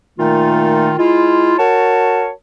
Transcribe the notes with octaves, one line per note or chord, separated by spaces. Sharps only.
A#2 D#3 A3 D#4 F4
G#3 E4 F4
F#4 A#4 C#5 A5